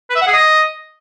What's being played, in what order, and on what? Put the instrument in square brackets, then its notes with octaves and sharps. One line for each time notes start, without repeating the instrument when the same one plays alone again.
[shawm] B4
E5
F#5
G#4
D#5